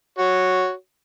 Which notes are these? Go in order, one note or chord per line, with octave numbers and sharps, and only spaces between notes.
F#4 C#5